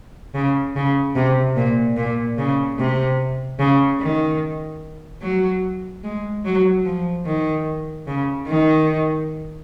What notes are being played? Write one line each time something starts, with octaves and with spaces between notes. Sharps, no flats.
C#3
C#3
C3
A#2
A#2
C#3
C3
C#3
D#3
F#3
G#3
F#3
F3
D#3
C#3
D#3